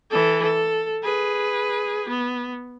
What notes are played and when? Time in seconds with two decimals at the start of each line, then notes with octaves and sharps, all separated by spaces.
0.10 E3 A4
0.43 A4
1.03 G#4 B4
2.09 B3